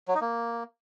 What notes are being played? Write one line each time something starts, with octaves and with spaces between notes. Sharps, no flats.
F#3
D#4
A#3